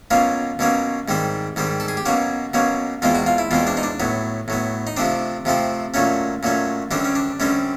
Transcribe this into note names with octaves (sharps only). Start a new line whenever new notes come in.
B2 F#3 A#3 C#4 F4
B2 F#3 A#3 C#4
G#2 D#3 G3 C4
G#2 D#3 G3 C4
A4
G#4
G4
B2 F#3 A#3 C#4 F#4
B2 F#3 A#3 C#4
E2 B2 G#3 C4 F4
F#4
F4
E4
E2 B2 G#3 C4 F4
D4
D#4
D4
A2 F#3 B3
A2 F#3 B3
D#4
C3 F3 A3 C4 D4
C3 F3 A3 C4
A#2 F#3 A3 C#4
A#2 F#3 A3 C#4
F#2 D3 G3 C4 D4
C#4
D4
F#2 D3 G3 C4 C#4